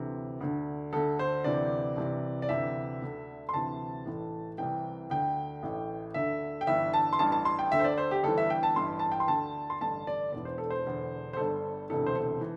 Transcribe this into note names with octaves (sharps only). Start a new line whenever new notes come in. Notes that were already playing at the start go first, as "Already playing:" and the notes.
Already playing: D2 C3 E3
D2 D3
D2 D3 A4
C5
D2 C3 E3 D5
C2 C3 E3
D5
D2 C3 E3 E5
D2 D3
C6
D2 C3 E3 A5
A1 A2 E3
C2 C3 E3 G5
D2 D3 G5
A1 A2 E3
D2 D3 E5
G5
G1 G2 E3 E5
A5
C6
A1 G2 E3 A5
A5
C6
G5
D2 D3 E5
C5
D5
C5
G4
G1 G2 E3 A4
E5
G5
A5
A1 G2 E3 C6
A5
G5
C6
D2 D3 A5
C6
A1 G2 D3 A5
D5
E1 E2 E3 D5
C5
A4
C5
E1 E2 D3
C5
G1 G2 D3 A4
E1 D2 C3 E3 A4
C5
A4
E3